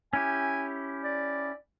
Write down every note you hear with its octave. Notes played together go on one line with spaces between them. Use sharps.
C#4 E4 G4 G#5
D5